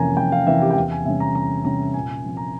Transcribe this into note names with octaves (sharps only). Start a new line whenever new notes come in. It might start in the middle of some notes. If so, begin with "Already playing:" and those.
Already playing: F2 C3 E3 A#3 C#4 G#5 A#5
F2 G5
F5
C3 E3 A#3 C#4 E5
G4
G5
E2 F5
G#5
C3 G3 C#4 E5
A#5
E2 A#5
C3 G3 C#4 A#5
A#2 G#5
F3 C4
A#5